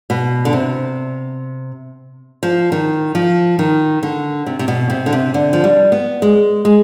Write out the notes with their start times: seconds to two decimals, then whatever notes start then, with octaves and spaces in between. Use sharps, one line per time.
0.10 B2
0.45 D3
0.53 C3
2.43 F3
2.72 D#3
3.15 F3
3.59 D#3
4.03 D3
4.46 C3
4.59 C3
4.68 B2
4.90 C3
5.06 D3
5.13 C3
5.34 D3
5.53 F3
5.64 G3
5.92 B3
6.22 G#3
6.65 G#3